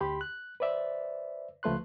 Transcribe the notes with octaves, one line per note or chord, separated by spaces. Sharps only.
D2 G4 B5 C6
F#6
B4 C5 D5 E5
C#2 F3 A3 B4 C6 F#6